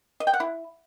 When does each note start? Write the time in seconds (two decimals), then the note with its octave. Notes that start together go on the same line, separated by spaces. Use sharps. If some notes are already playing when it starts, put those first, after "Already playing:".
0.20 D#5
0.27 G5
0.34 F#5
0.40 E4